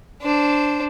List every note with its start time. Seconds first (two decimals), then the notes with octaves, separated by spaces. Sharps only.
0.22 D4 C5